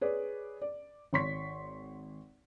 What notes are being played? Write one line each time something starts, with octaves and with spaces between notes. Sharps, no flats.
G#4 B4 C#5 D5
D5
G#1 C#5 C6 C#6 B6